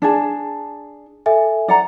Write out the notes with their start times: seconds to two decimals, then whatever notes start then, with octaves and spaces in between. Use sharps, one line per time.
0.02 D4 G#4 A5
1.26 A4 E5 G#5
1.68 D5 F#5 A#5